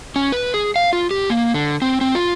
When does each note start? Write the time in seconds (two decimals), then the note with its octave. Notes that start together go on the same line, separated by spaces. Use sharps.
0.16 C#4
0.32 B4
0.54 G#4
0.76 F5
0.93 F4
1.11 G4
1.30 A#3
1.54 D3
1.82 C4
2.01 C4
2.15 F4